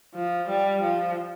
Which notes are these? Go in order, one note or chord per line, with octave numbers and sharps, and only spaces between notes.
F3
G3
F3